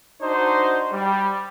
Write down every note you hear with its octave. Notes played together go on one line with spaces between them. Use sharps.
D4 D#4 F#4 C5
G3